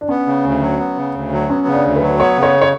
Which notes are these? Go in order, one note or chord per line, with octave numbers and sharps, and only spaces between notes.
D4
B3 C#4
C#3
D2
F#3
B3
C#3
D2
F#3
B3 C#4
C#3
D4
D2
B4
F#3
B3 C#5
C#3
C#5
C#5